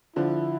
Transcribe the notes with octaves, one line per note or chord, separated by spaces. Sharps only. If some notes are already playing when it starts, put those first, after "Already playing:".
D3 F3 E4